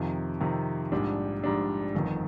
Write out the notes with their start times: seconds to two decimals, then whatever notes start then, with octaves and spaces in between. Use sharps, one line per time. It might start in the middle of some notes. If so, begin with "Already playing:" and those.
Already playing: F2 C3 D#3
0.41 F2 C3 D#3
0.92 A#1 G#2 G3 D4
1.43 A#1 G#2 G3 D4
1.95 G1 F2 D#3